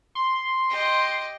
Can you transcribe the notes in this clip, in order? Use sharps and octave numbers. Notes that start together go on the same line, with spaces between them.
C6
G4 D#5